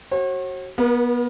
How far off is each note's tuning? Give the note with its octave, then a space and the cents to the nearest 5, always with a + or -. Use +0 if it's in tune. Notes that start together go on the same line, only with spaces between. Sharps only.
F#4 +20 C#5 -45
B3 -25 A#4 +35